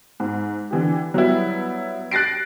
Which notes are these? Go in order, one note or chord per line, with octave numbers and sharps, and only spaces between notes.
G#2
D3 E3 G4
F#3 G3 B3 E4
F#6 A6 A#6 C7 D7